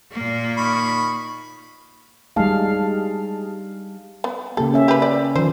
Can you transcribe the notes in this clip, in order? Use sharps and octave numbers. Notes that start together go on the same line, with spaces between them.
A#2 A#3
D#3 B5 C#6
G3 G#3 D#4 F5 A5
B3
C#3 A#3 G4 A4
C#4 E5
G4 B4
D5
D#3 F3 C5